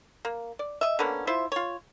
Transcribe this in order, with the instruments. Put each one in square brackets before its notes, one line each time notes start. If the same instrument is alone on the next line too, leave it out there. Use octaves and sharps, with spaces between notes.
[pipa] A#3
D5
D#5 E5
D3 A#3 B3 C#4
E4 F4 C5 E5
F4 C#5